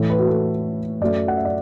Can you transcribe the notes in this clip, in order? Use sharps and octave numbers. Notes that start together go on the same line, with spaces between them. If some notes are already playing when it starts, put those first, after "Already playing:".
Already playing: A2 E3 A3
B4
F#4
A4
F#2 F#3 A3 D5
F#5
E5
D5